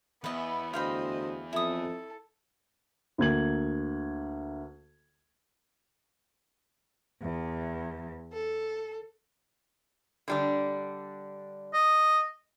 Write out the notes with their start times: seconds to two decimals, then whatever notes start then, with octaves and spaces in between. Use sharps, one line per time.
0.24 E2 B3 B4 D#5 E5
0.73 D2 C5 D#5 F5 G5 B5
1.53 F2 E4 A4 D#6
3.18 D2 A#3 G#6 F#7
7.21 E2
8.32 A4
10.28 D3 G3 D4
11.74 D#5